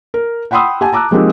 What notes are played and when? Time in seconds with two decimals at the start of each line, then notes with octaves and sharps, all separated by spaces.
0.14 A#4
0.51 F#5 G5 B5 C6 D#6 E6
0.81 G4 F#5 G#5 A5
0.92 A5 A#5 D6 E6 F#6
1.11 F3 G#3 A#3 C4 D#4 G4